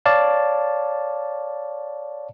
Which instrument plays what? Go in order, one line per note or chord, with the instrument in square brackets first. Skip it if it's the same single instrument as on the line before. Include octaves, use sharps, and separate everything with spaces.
[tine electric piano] C#5 D5 F5 A5